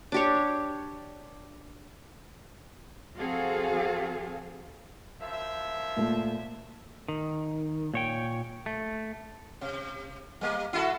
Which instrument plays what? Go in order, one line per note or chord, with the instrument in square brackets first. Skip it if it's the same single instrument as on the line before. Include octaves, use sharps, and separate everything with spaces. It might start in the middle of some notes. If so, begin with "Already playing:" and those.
[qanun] D4 G4 C#5
[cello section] F2 C4 F#4 G#4 A4 F5
[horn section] F#2 F3 E5
[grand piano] A#2 A3
[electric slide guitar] D#3
A#2 C#5 G5
A3
[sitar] C3
G3 A#3
E4 F#4 A4